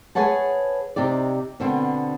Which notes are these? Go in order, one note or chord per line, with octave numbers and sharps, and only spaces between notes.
G#4 B4 C#5 F#5 A5
C3 D#4 G4 D5
B2 D3 B3 C4